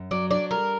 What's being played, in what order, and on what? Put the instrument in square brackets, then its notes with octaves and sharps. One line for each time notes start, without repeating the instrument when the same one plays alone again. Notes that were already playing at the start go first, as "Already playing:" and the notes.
Already playing: [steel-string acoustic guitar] F#2
[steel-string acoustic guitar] F#3 [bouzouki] D5
[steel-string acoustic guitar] D4 [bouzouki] D5
[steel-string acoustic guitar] G3 [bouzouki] A#4